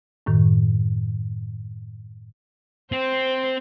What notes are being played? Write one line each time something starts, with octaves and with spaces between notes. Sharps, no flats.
F#2 A2 D#3
C4 C5